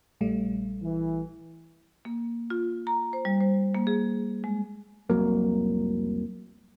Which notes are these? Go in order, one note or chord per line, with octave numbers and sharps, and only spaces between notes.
A#1 G3 A3
E3
A#3
F4
A#5
C5
G3
C5
A#3
G#4
G#3
F1 C2 F#3 A#3